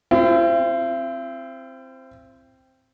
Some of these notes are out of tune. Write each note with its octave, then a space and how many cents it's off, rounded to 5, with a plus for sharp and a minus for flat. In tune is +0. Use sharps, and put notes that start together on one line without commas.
C4 +0 E4 +45